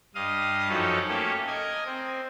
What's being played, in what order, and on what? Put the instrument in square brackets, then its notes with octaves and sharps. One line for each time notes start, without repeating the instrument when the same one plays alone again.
[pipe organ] G2 D#5 F5 D#6
F#2 F3 D#4 F#4 A4 C#5
A3 A#3 C#4 G4 A4
A#4 D#5 G#5
C4